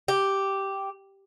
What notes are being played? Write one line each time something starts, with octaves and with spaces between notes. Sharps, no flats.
G4